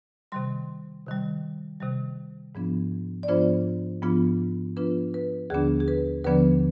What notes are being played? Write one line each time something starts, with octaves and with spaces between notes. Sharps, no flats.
C3 D#3 G3 C6
C3 D#3 G3
C3 D#3 G3
G#2 F3 B3 D4 F4
D5
G#2 F3 B3 D4 F4 C5
G#2 F3 B3 D4 F4
G#2 F3 B3 D4 F4 B4
B4
D#2 D3 F3 B3 D4 G#4
G#4
B4
D#2 D3 F3 B3 D4 B4